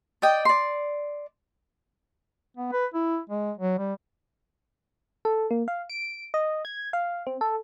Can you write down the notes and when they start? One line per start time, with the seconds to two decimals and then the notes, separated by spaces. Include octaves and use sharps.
0.22 D5 D#5 G5
0.45 D5 C6
2.57 B3
2.72 B4
2.94 E4
3.30 G#3
3.57 F#3
3.79 G3
5.25 A4
5.51 A#3
5.68 F5
5.90 D7
6.34 D#5
6.65 G#6
6.93 F5
7.27 C4
7.41 A4